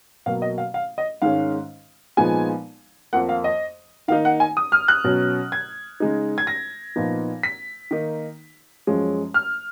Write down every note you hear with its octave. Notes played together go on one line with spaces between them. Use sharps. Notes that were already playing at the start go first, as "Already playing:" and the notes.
B2 F#3 A#3 F5
D#5
F5
F5
D#5
G#2 D#3 G#3 C#4 F5
A#2 F3 G#3 B3 D#4 G#5
F2 F3 A#3 F#5
F5
D#5
D#3 A#3 D#4 F5
F#5
G#5
D#6
F6
F#6
B2 F#3 C#4
G#6
C#3 G#3 D#4
G#6
A#6
A#2 F3 B3 D#4
B6
D#3 A#3 D#4
F#2 F3 G#3 C#4
F6